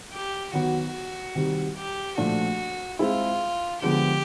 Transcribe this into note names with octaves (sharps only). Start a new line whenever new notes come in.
G4
D#3 F#3 B3 F#4
C3 D#3 G3
G4
A#2 F3 A3 D4 F#4
G#3 C4 E4 F4 G#4
D3 F3 G#3 B3 G4